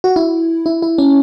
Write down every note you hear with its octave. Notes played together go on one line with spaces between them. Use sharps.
F#4
E4
E4
E4
C#4